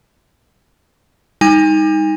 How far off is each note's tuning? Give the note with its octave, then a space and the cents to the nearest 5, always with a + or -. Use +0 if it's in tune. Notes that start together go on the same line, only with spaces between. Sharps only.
G3 +35 D#4 +15 G#5 -40